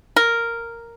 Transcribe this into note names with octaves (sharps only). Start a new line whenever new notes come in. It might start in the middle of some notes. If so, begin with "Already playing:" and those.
A#4